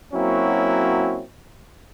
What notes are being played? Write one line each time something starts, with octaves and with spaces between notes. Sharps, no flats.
F#3 A#3 C4 C#4 E4 F#4